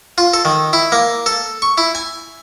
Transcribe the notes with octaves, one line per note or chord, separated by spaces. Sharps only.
F4
A4
D#3
E4
A#3
A4
C#6
E4
G#5